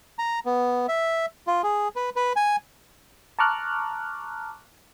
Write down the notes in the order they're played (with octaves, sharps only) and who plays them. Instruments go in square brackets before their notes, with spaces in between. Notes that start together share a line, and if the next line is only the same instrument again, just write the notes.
[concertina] A#5
B3
E5
F4
G#4
B4
B4
G#5
[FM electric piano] A5 A#5 C#6 D6 F6 F#6